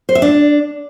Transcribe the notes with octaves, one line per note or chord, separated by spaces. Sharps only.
C5
E5
D4